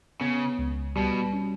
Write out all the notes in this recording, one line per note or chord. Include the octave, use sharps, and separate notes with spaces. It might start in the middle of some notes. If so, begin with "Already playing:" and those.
C#3 B3
C#2
B2 G3
C#4